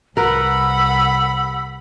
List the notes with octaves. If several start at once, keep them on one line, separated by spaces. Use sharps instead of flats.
C2 A#4 B4 F#5 B5 E6